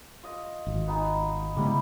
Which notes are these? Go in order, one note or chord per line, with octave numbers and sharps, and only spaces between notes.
F4 D#5
G#1
B3 D#4 G#5
C#3 G3 G#3 B3 E4